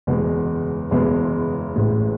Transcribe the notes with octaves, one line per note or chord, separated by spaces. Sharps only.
F#1 E2 B2 G#3
F#1 E2 B2 G#3
A1 A2 G#3